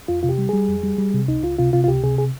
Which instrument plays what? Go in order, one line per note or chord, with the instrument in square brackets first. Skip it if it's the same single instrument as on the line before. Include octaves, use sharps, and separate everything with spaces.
[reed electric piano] F2 F4
C3 F4
G4
G3
G3 G#4
F2
G3
G3
C3
C#2 D#4
C#2 F4
C3 F4
C3 F4
F4
C#2 G4
C3 G#4
G#4